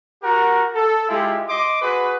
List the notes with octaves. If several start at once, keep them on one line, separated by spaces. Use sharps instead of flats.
F#4 G4 A#4 F#5 A#5
A4
G#3 E4 F4 G4
D#5 C6 D6
F#4 G#4 B4